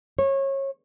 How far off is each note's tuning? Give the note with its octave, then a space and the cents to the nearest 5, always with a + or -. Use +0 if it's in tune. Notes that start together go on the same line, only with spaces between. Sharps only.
C#5 -25